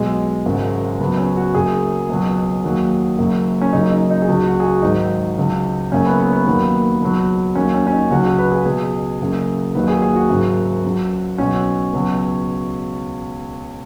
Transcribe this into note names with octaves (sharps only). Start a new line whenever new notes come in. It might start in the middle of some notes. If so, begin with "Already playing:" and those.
Already playing: B1 B2 F#3 G#3
G#1 F#2 C#3 F#3
C#2 C#3 F#3 B3
C#4
F#4
F#1 F#2 F#3 G#4
C#2 B2 F#3
D#2 D#3 F#3
F#1 F#2 F#3
C#4
F#1 F#2 C#3 F#3 D#4
D#4
D#4
G#4
C#2 C#3 F#3 F#4
F#4
G#4
F#4
G#1 G#2 D#3 F#3 D#4
C#2 C#3 F#3
F#1 F#2 C#3 C#4
B3
B3
B3
D#2 D#3 F#3 B3
C#2 B2 F#3
D#2 D#3 F#3 C#4
C#4
C#4
D#4
C#2 C#3 F#3 F#4
G#4
B4
G#4
C#2 B2 F#3 G#4
F#1 F#2 C#3
D#2 D#3 F#3 B4
G#4
G#4
F#4
G#1 F#2 C#3 F#3
C#2 C#3 F#3
B1 B2 F#3 C#4
C#2 B2 F#3